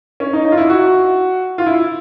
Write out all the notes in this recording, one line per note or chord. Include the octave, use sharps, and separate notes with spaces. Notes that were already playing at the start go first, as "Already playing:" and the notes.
C#4
D#4
D#4
F4
E4
F#4
F4
E4